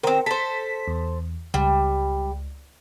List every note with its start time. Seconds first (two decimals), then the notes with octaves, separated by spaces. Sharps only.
0.03 D#3 C4 A#4 C5 A#5
0.26 A4 C5 B6
0.88 E2
1.54 C#2 G3